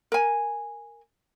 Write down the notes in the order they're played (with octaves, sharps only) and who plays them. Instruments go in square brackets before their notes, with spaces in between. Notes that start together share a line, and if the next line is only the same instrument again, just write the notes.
[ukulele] A#4 G#5